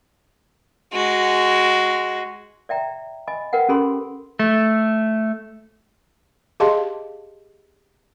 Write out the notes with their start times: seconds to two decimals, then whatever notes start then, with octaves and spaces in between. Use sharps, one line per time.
0.93 G#3 F#4
2.69 D5 E5 G5 A#5
3.28 D#5 G#5 B5
3.53 A#4 B4 F#5 G5
3.69 C#4 G4 A4 A#4 B5 C6
4.39 A3
6.60 G4 G#4 D#5 F5 A5 C6